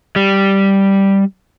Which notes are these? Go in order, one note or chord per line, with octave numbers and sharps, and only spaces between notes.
G3